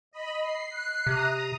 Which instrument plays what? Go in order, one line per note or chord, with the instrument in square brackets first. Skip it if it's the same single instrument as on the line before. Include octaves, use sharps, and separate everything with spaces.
[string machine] D#5 B5
C7
[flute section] F#6
[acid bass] C3 [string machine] A#5 D#6